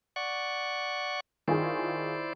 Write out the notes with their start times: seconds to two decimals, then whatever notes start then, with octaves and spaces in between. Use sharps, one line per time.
0.16 D5 F#5 C#6
1.48 D#3 E4 F4 G#4 C5 D5